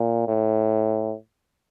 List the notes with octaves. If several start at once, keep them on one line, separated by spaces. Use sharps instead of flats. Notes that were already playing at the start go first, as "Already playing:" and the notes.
Already playing: A#2
A2